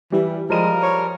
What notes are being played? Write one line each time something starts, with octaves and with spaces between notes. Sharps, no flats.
E3 G3
F3 G3 G#3 A#4 D#7
C#5